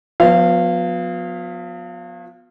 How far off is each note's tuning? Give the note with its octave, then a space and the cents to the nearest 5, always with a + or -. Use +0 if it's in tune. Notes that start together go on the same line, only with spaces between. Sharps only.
F3 +45 B3 +0 F5 -20